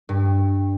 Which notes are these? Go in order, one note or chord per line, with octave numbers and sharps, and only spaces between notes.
G2